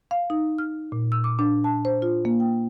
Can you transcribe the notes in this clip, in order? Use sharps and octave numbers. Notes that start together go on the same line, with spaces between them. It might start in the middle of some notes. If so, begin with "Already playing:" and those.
F5
D#4
F6
A#2
E6
D6
D4
A5
C5
F4
A#3
G5